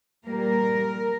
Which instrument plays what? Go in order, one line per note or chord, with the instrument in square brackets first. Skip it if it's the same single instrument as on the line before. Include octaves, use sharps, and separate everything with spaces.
[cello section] A#2 G3 A#3 A#4